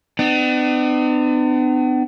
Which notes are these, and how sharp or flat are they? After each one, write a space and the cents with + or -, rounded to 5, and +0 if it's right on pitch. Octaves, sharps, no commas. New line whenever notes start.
B3 +45 D4 +45